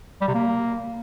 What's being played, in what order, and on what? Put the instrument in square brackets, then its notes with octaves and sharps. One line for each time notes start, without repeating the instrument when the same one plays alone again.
[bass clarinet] G3
C3
A#3